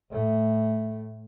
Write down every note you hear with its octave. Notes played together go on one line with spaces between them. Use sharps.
A2 A3